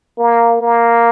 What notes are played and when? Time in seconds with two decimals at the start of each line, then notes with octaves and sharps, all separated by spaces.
0.18 A#3
0.61 A#3